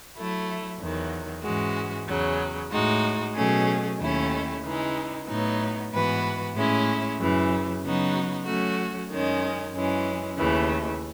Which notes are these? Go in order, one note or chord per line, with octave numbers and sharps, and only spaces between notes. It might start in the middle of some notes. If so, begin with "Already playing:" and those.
F#3 A3 E4
E2 D#3 F#3
G#2 E3 G#3 C#4 F#4
E2 C#3 F#3
A2 G#3 D#4 F#4
B2 F#3 A3 C#4 G#4
D#2 D#3 A3 C#4 E4
C#3 E3 G#3 D#4
A2 F#3 B3 D#4
G#2 E3 B3 F#4 B4
A2 G#3 C#4 E4
F#2 C#3 E3
C#3 F#3 B3 D#4 F#4
F#3 A3 C#4 F#4
F#2 D#3 G#3 C#4
F#2 E3 G#3 C#4
D#2 C#3 E3 A3